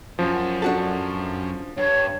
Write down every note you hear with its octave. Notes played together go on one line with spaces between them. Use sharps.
F#2 F3
D4 F#4 A4
G2 C#5